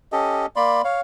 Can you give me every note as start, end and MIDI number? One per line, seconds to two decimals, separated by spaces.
0.12 0.46 61
0.12 0.46 67
0.12 0.46 69
0.12 0.46 75
0.56 0.82 58
0.56 0.82 74
0.56 0.82 83
0.56 0.82 84
0.84 1.01 73
0.84 1.01 77